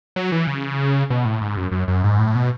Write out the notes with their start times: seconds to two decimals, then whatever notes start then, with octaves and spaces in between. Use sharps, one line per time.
0.16 F#3
0.32 E3
0.47 C#3
1.10 B2
1.25 A2
1.41 G#2
1.57 F#2
1.72 F#2
1.88 F#2
2.04 G#2
2.19 A2
2.35 B2